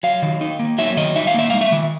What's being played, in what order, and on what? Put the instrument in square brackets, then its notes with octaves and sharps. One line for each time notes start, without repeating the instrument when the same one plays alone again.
[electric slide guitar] F#3 F5
D#3
D#4
A#3
F#3 E5
D#3 D#5
D#4 E5
F5
A#3 E5
G#3 F5
E5
D#3